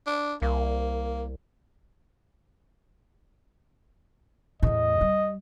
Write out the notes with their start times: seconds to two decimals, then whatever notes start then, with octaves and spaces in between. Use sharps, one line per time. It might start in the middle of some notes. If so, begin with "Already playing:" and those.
0.07 D4
0.42 C2 A#3
4.63 E2 A2 D#5
5.01 G3